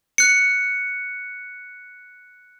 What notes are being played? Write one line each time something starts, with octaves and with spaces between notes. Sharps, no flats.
F#6 C#7